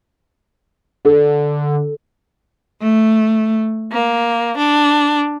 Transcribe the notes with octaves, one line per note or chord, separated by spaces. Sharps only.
D3 A4
A3
A#3
D4